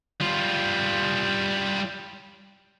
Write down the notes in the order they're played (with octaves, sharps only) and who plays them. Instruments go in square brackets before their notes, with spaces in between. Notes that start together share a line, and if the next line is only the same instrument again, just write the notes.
[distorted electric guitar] G3 F4